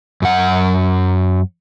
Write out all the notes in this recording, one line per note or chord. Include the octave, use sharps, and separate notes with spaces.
F#2 F#5